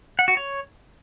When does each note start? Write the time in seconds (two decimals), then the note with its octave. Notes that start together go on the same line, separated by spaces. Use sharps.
0.19 F#5
0.28 F#4
0.37 C#5